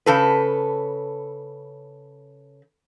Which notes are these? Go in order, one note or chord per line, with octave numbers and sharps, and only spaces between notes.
C#3 A4 B4